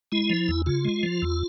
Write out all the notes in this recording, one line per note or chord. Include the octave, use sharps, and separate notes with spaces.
G#3 E4
F3
E2
C#3 F4
G#3
F3
E2